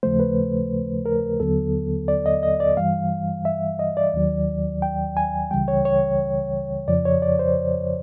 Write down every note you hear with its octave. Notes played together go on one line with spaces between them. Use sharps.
D#2 C#3 F3 A3 C5
B4
A#4
D#2 D3 F#3 B3 A4
D5
D#5
D#5
D5
G2 E3 G3 F5
E5
D#5
D5
D#2 D#3 F#3
G5
G#5
C#2 C#3 E3 G3 G5
C#5
C#5
F2 C#3 F3 D5
C#5
D5
C5